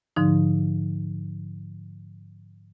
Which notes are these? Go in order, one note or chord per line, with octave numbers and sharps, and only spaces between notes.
G#2 D3 F3 D#4